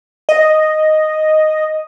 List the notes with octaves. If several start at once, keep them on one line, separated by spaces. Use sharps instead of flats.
D#5